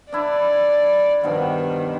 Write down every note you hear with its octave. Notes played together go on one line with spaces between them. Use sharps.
D4 E4 D5
G2 B2 D#3 F3